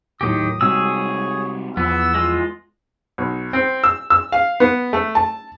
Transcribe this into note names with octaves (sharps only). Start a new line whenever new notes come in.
D#2 A2 D#3 F#3 G4 D#6
C3 G3 G#3 C4 F#4 G#4 C#5 E6
E2 F3 B3 E6
G#3 F4
B1
C4
E6
E6
F5
B3
A3
A5